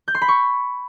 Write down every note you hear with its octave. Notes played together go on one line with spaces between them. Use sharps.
G6
C6
B5
C#6